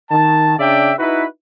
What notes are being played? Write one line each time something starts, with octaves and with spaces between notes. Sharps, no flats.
D#3 A5
C#3 D4 D5 E5 G5
D#4 E4 F#4 B4